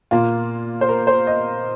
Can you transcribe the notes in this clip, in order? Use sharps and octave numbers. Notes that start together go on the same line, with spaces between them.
A#2 A#3 F4
C5
A#4
C5
D#5